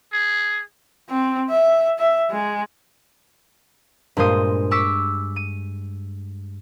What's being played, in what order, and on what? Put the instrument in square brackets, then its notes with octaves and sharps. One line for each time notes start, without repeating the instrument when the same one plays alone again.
[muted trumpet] G#4
[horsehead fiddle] C4
E5
E5
G#3
[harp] G2 A#2 G#3 C5 D#6
C#6 D6 E6 B6
D#7